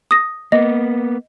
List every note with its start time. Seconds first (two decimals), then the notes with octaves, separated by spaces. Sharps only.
0.11 D#6 A#6
0.52 A#3 B3 D#5